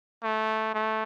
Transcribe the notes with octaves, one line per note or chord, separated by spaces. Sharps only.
A3
A3